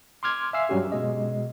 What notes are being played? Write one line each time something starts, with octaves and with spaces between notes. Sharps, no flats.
C6 D6 F6 G#6
E5 F5 G#5 E6 C7
G2 F#3 G3 C#4 F#4 G4
B2 G#3 D#5